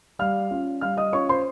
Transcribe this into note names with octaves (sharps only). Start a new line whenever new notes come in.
G3 F5 F6
C#4 F4
G3 F5 F6
D#5 D#6
C#4 F4 C#5 C#6
C5 C6